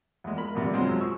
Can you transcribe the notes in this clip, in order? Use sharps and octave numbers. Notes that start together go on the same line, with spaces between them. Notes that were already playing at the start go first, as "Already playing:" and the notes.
E2 G#3
A#4 B5
E2 G2 C3 G3
F#2 F#3 G#3 C4 F4
F3 F#3
G#4 C#6 E6